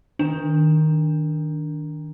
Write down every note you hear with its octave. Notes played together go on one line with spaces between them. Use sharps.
D#3 D4